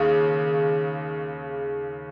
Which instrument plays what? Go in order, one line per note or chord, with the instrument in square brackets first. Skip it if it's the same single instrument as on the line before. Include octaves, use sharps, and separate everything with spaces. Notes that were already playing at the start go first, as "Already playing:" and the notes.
Already playing: [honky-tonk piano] D#2 C#3